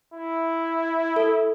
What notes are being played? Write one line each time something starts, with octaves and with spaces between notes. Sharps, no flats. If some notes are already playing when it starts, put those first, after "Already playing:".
E4
A4